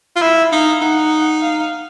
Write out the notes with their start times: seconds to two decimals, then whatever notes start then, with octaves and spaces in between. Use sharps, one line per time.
0.16 F4
0.21 E4 E5
0.52 D#4 F5
0.81 D#4 F#5
1.42 F5